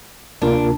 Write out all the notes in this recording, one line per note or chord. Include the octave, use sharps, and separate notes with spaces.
D2 C3 A#3 D4 F4 A#4